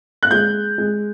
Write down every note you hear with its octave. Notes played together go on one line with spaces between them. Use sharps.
F#6
G#3 G6
G#3